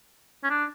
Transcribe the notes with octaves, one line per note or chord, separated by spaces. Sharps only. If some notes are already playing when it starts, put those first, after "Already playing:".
C#4
D4